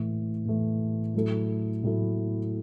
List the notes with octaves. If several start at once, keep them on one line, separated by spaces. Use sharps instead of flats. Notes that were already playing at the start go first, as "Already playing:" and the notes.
Already playing: A2 E3 A3
A2 E3 A3
A2 F#3 A3 E4 A4
A2 F#3 A3 E4 A4